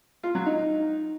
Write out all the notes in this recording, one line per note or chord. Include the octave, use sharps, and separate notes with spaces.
F4
F#3
D#4